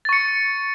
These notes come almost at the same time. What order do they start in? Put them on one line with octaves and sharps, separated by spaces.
A6 C#6 C#7